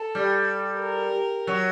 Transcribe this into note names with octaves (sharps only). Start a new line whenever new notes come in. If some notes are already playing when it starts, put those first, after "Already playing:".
Already playing: A4
G3
A#4
F#3